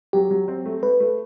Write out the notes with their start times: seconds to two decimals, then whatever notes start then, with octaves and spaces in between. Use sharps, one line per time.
0.13 F#3 G4
0.31 F#3
0.48 C4
0.66 A3
0.83 A3 B4
1.00 A3